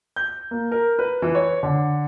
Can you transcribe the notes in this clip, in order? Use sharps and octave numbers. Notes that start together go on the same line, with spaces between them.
G6
A#3
A#4
B4
E3
C#5
D3